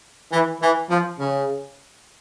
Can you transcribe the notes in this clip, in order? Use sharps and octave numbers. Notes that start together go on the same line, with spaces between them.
E3
E3
F3
C#3